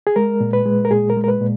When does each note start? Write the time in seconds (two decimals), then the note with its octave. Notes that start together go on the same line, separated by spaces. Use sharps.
0.07 G#4
0.16 G#3 A#4
0.41 A#2
0.53 B4
0.66 G#3
0.85 A#4
0.91 A#2 G#4
1.10 A#4
1.17 G#3
1.24 A#4
1.28 B4
1.41 A#2